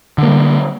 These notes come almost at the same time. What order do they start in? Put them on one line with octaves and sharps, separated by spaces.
D3 A#3 G3